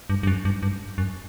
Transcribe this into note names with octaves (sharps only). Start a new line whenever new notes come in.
G2
G2
F#2
G2
G2
F#2